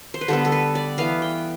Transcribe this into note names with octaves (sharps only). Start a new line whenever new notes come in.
C5
B4
D3 G3 B3 A4
A4
B4
D5
E3 B3 F5
G5